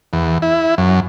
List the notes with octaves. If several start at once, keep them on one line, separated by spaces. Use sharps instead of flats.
E2
E4
F#2